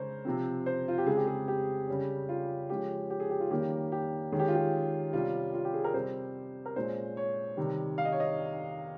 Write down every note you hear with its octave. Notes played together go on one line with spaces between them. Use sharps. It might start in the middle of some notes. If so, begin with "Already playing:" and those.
Already playing: C#3 G#3 C#4 A#4 C5 C#5
C3 F3 C4
C5
F4
G4
C#3 G#3 C4 G#4
G4
G#4
G4
C#3 G3 C#4
F4
F3 G#3 C#4 G4
G4
G#4
G4
F4
D#3 G3 A#3 C#4 G4
G4
D#3 G#3 C#4 G#4
G4
F4
G4
C3 G3 C#4 F4
F4
G4
G#4
A#4
C3 G3 C4 C5
A#4
A#2 G#3 C#4 C5
C#5
C3 D#3 G3
F5
D#5
C#5
D#5